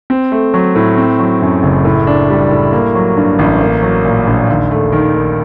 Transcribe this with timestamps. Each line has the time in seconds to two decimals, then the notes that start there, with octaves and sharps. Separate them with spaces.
0.10 C4
0.32 A3
0.54 F#3
0.75 A2
0.97 C4
1.19 F#3
1.42 F#2
1.63 F#1
1.85 A2
2.07 D4
2.30 G3
2.51 A2
2.73 A#3
2.95 F#3
3.17 G2
3.39 A1
3.61 A#3
3.82 F#3
4.05 A#2
4.27 A#1
4.49 D#2
4.71 A3
4.92 D#3
5.14 D#2